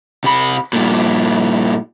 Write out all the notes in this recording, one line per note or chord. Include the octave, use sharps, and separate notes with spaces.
C3 B5
G2 A#2